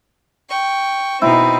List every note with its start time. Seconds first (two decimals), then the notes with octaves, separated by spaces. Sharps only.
0.48 G5 C#6
1.22 B2 C4 D#4 E4